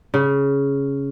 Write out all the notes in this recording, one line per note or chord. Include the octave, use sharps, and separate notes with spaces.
C#3